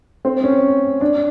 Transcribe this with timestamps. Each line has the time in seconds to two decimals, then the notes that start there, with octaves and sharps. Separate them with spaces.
0.25 C4
0.44 C#4
1.01 D4